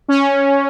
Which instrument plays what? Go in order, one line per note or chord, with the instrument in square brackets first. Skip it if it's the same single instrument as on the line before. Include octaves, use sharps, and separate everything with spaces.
[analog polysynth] C#4